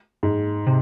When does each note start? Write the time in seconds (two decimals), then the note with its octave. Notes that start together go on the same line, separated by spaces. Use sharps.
0.23 G#2
0.67 C3